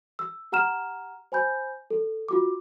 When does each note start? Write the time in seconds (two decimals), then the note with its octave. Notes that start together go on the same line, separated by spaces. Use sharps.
0.19 E6
0.52 G4 F#5 A#5 F6 E7
1.32 C5 G#5 B5 G6
1.90 A4
2.28 F4 F#4 D6